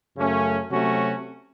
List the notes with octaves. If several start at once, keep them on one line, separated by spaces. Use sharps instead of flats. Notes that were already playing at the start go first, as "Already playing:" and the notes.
F#2 C#3 A3 C#4
C3 F#3 A3 C#4 F#4